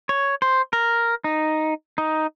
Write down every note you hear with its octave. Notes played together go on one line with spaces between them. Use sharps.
C#5
C5
A#4
D#4
D#4